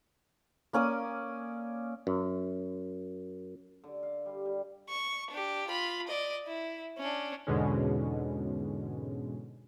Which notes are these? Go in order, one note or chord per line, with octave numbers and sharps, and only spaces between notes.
A#3 C#4 D5 D#6
F#2
D3
F5
G3
G3
C#6
D4 G4
F4 B5
D5 D#5
E4
C#4 D4
E2 G#2 B2 D3 G#3 C#4